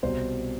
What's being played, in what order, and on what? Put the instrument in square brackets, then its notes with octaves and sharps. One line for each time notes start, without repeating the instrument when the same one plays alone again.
[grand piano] C2 B2 C5